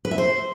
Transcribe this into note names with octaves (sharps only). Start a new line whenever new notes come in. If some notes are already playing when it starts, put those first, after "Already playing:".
B4
E5
C5